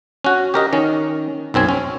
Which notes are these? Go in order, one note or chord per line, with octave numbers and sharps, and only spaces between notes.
C#4 F#4
G4 A#4 D#5
D#3 C#4
B1 F#2 C4 G#5
C#4